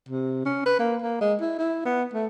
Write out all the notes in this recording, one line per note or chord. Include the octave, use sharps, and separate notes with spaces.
C3
C#4
B4
A#3
A#3
G#3
E4
E4
B3
A3